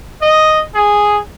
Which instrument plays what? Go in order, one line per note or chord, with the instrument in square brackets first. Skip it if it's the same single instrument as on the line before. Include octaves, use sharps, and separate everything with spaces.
[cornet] D#5
G#4